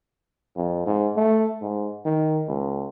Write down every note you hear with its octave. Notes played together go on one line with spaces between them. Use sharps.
F2
G#2
A3
G#2
D#3
C#2